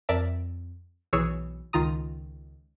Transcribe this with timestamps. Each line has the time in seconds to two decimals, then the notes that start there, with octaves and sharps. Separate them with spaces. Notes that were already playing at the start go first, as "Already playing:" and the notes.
0.09 F2 A#4 D5 E5 A5
1.13 B1 E3 G#4 C#5 C#6 E6
1.73 C#2 D#3 F4 A#5 D#6